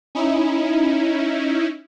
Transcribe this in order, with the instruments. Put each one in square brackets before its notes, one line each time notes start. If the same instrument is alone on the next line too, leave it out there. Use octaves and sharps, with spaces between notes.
[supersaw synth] C#4 D#4 E4